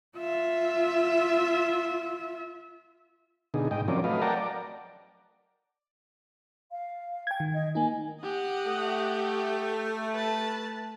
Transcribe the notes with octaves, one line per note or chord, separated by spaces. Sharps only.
F4 E5
B2 D3 D#4 G#4
G#2 D#5 G5
F3 F#3 C4 C#4 A#4 D5
F#3 A3 B4 D#5 F5
A#4 D5 F#5 G5 A5 A#5
D5
F5
G5 G#6
D#3
D#5
A#3 D#4 G#5
G4 D#5 F#5
A3
B4 A5